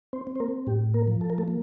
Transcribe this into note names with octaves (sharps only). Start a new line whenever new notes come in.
C4 C5
C4
C5
A#3 A#4
A2 G4
A#3 A#4
F3
A4
A#4
A3 A4
A#3